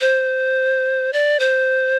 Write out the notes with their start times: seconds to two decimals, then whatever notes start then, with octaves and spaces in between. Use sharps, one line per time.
0.01 C5
1.13 D5
1.40 C5